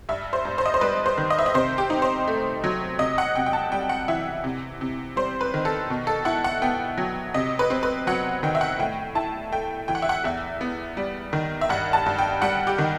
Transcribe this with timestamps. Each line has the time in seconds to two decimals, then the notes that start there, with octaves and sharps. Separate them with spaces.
0.09 G2 E5
0.33 C5
0.45 G2
0.58 C5
0.66 D#5
0.74 C5
0.81 G3 B4
1.06 C5
1.17 D#3
1.30 D#5
1.39 E5
1.46 D#5
1.54 C3 C5
1.78 G4
1.90 D#4
2.02 C5
2.27 A3
2.64 F#3
2.99 C3 D#5
3.18 F#5
3.35 C3 G5
3.46 G5
3.53 A5
3.72 G3 G5
3.89 F#5
4.08 E3 E5
4.44 C3
4.81 C3
5.16 G3 C5
5.41 B4
5.54 D#3
5.65 A4
5.90 B2
6.07 A4
6.25 E4 F#5
6.44 F#5
6.62 B3 G5
6.98 F#3
7.34 C3 D#5
7.59 B4
7.70 C4
7.83 B4
8.07 F#3 F#5
8.43 D#3 G5
8.55 E5
8.61 F#5
8.79 A2 G5
9.15 E4 A5
9.52 A3 G5
9.88 E3 G5
9.95 F#5
10.02 E5
10.09 F#5
10.24 E2 E5
10.61 B3
10.97 G3
11.33 D#3
11.61 E5
11.69 G2 F#5
11.93 A5
12.06 G2
12.19 G5
12.42 G3 F#5
12.67 G4
12.78 D#3